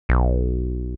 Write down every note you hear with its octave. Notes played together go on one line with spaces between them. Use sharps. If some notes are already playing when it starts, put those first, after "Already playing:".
B1